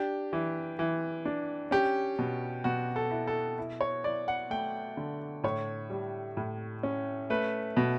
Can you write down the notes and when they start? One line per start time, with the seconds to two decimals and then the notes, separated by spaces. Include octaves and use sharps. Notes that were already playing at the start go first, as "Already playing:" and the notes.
Already playing: D4 G4
0.33 E3
0.79 E3
1.25 D4
1.71 C#4 G4
2.19 B2
2.64 B2 F#4
2.96 A4
3.11 E4
3.27 A4
3.58 E4
3.81 C#5
4.04 E4 D5
4.28 F#5
4.50 A3 G5
4.97 D3
5.44 A2 C#5
5.90 G3
6.37 A2
6.83 C#4
7.30 A3 B4
7.77 B2